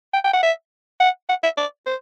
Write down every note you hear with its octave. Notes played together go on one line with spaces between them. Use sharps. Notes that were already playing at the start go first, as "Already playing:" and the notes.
G5
G5
F#5
E5
F#5
F#5
E5
D5
C5